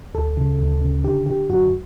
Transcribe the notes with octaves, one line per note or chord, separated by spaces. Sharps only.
D2 A4
C#3
D2
C#3
D3 G4
D3 G4
F#2 F#4